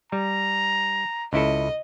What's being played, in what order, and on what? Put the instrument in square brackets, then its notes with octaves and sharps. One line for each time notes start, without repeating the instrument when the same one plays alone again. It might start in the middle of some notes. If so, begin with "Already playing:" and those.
[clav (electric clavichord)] G3 [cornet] A#5
[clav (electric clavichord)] C#2 E4 A4 [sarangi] D#5